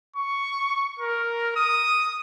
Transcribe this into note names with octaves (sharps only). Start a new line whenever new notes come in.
C#6
A#4
D#6